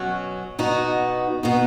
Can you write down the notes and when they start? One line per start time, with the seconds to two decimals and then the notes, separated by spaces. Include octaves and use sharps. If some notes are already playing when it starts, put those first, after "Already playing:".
Already playing: B2 F#3 C#4 F#4
0.59 B2 B3 D#4 F#4
1.43 B2 B3 D#4 F#4